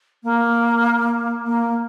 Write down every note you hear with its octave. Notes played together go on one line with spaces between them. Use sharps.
A#3
A#3